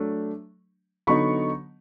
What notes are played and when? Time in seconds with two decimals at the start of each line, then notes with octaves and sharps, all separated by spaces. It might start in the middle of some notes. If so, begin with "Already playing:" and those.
Already playing: F#3 A3 D4
1.07 D3 F#3 B3 D#4 B5 C#6